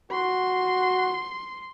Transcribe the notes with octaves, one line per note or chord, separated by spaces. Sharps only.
F#4 C6